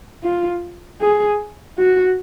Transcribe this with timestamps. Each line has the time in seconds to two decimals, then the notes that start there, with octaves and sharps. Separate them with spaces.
0.24 F4
1.01 G#4
1.78 F#4